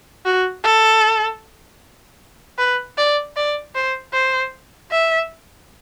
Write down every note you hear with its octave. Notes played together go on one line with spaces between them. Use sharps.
F#4
A4
B4
D5
D5
C5
C5
E5